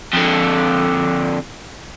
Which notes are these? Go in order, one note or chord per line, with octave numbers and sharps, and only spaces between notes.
F2 D3